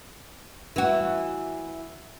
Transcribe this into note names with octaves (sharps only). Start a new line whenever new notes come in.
E3 F#4